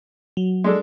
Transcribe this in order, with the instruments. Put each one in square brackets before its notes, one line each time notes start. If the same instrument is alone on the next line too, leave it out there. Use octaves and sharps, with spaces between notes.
[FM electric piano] F#3
[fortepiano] G#3 D4 A4